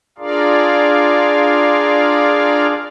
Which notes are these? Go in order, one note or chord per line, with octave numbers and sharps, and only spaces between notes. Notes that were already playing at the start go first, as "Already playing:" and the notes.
D4 F4 G#4 A#4 D5 F5